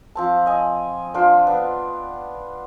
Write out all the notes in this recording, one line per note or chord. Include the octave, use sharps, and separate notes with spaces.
F3 C4 A5
D#5 G#5
D4 F4 C5 G5
B3 D4